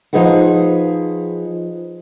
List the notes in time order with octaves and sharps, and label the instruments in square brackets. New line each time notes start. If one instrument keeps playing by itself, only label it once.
[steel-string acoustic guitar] F3 D#4 G#4 B4 F#5